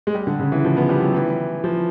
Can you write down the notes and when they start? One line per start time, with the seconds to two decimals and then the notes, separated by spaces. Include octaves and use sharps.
0.07 G#3
0.15 G3
0.27 D3
0.39 C#3
0.52 E3
0.64 F3
0.77 B3
0.89 G3
1.02 F#3
1.14 E3
1.64 F3